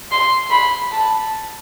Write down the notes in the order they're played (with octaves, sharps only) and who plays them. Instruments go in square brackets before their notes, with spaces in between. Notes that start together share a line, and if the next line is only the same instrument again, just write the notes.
[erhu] C6
B5
A5